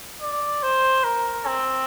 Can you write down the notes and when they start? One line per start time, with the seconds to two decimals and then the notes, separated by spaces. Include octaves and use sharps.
0.21 D5
0.63 C5
1.04 A#4
1.46 C4